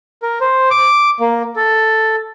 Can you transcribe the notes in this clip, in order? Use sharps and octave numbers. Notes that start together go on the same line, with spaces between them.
A#4
C5
D6
A#3
A4